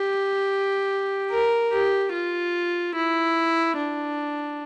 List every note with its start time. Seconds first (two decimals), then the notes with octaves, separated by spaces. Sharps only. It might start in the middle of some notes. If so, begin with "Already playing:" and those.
Already playing: G4
1.31 A#4
1.72 G4
2.13 F4
2.95 E4
3.77 D4